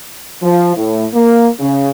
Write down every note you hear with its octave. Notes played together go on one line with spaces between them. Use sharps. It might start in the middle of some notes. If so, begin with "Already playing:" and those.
F3
A2
A#3
C#3